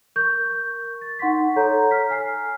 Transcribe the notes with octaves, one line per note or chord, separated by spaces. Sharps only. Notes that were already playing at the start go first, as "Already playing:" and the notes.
A#4 C#6 G6
A6
D#4 F#5 C6 C#6 B6
A4 C#5 A#5 G6
F6 B6
G#5 F6 C7